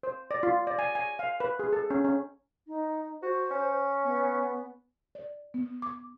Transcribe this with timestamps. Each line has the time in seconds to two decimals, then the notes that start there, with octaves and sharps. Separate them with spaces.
0.03 C5
0.31 D5
0.43 F4
0.67 D5
0.79 G#5
0.95 G#5
1.19 F5
1.40 B4
1.59 G#4
1.73 A4
1.90 C#4
2.05 C#4
2.67 D#4
3.22 F#4 C5
3.51 C#4
4.04 B3
5.15 D5
5.54 B3
5.82 D6